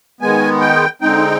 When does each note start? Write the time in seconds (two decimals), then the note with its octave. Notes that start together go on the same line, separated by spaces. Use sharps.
0.21 D#3 G#3 B3 G#5
0.61 G5
1.01 D3 G#3 C4 D#4 G5